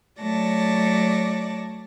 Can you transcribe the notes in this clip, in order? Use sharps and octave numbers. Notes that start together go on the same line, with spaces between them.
F#3 A3 C#5 D5 A5 A#6